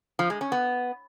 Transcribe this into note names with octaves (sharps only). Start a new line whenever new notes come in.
F3
G#3
C#4
B3